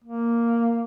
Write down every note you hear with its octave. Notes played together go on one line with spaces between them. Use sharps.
A#3